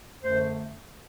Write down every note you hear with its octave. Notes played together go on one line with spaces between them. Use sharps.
F#2 D3 A3 C5